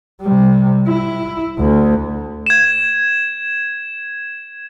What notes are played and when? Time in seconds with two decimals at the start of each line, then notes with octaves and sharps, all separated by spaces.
0.22 C3 G3
0.87 E4
1.59 D2
2.46 G#6 E7